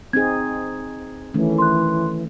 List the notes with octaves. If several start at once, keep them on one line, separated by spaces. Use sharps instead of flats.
C4 D#4 G#4 G#6
D#3 E3 A3 C#4
C6 F#6